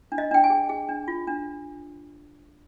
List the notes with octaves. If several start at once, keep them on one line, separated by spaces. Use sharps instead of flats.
D4
D#5
D4 G5
G#5
G#4
G#4
D4
F4
D4